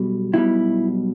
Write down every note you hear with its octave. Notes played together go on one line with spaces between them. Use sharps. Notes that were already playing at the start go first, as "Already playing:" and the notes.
Already playing: B1 B2 G3
B1 B2 G3 E4